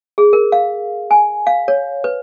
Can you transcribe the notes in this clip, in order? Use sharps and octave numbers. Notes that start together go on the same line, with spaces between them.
G#4
A#4
F5
G#5
F5
C#5
B4